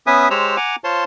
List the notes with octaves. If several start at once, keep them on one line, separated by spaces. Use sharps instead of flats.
B3 C#4 B4 E5 G#5 D#6
G#3 G4 C5 C#5 A#5 E6
F#5 G#5 A#5 D6
F4 C5 C#5 A5 C6